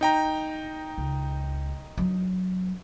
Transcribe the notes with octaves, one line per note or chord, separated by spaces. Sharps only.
D#4 G5 A#5
C#2
F#3 D4